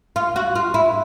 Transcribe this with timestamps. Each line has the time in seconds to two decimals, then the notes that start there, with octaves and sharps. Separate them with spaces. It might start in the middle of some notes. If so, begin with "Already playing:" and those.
0.16 F4
0.36 F#4
0.55 F4
0.74 E4